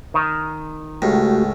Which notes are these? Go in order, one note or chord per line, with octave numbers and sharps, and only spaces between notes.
D#3
C#2 A2 A3 F#4 G4